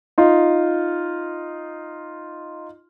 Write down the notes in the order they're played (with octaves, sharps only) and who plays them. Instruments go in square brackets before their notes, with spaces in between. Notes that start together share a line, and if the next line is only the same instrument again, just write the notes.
[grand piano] D#4 F4